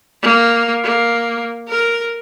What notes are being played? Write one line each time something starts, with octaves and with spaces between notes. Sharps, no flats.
A#3
A#3
A#4